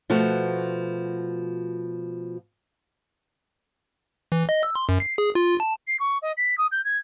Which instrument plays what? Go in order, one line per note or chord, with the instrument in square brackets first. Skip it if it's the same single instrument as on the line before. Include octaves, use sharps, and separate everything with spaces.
[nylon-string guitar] B2 F3 A3 F#4
[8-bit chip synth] E3
D#5
E6
C6
F#2
C7
G#4
F4
A5
[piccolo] C7
C#6
D#5
B6
D#6
G6
G#6